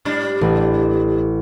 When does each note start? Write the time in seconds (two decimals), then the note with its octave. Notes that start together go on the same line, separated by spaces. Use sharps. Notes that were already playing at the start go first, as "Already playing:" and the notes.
0.05 G#2 G3 D4
0.41 A1